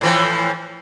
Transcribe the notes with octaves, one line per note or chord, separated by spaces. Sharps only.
A2 E3 F3